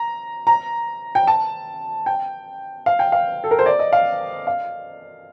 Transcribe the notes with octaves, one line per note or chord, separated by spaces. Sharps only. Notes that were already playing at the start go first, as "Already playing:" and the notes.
Already playing: A#5
A#5
G5
A5
G5
F5
G5
F5
A4
A#4
C5
D5
D#5
F5
F5